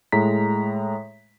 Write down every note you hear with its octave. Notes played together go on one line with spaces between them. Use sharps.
A2 G#3 A#5 B6